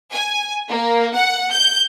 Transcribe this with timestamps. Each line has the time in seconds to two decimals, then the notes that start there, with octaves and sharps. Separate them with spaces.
0.12 G#5
0.69 A#3
1.15 F#5
1.52 G6